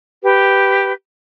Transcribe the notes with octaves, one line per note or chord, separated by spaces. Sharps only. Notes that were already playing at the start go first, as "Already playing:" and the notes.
G4 B4